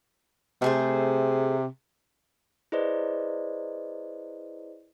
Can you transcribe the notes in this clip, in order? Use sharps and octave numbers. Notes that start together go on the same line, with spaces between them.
C3 A3 G#4 C5
E4 G#4 B4 C5 D5 D#5